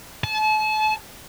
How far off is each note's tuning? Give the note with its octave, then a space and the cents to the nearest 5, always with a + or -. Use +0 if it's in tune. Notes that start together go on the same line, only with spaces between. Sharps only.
A5 -35